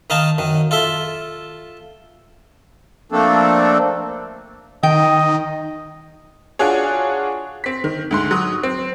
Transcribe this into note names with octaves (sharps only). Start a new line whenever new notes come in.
D#3 D#4 F5 A5
F#2 D#3
F4 A4 E5 C6
F3 A3 A#3 C4 D4 A4
D#3 D#5 G5
D4 F4 F#4 G#4 C#5
C4 B6
D#3
D2 G#2 C6
F#3 D#6
C4